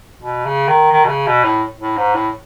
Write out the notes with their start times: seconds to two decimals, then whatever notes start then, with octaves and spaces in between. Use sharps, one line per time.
0.22 B2
0.45 C#3
0.68 D#3
0.92 D#3
1.05 B2
1.09 C#3
1.27 B2
1.44 A2
1.80 A2
1.97 G#2
2.15 A2